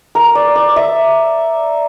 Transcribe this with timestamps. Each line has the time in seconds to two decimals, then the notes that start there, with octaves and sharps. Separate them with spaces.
0.15 A#4
0.35 D5
0.56 D5
0.76 E5